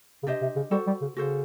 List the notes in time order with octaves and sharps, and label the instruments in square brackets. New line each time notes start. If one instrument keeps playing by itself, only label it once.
[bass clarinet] C#3
[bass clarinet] C3 [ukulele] D4 G4 C5 D#5
[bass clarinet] C3
C#3
[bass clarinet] G3 [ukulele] F#4 A4 C5
[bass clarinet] G3
C#3
[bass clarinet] C#3 [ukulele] F#4 A4 C5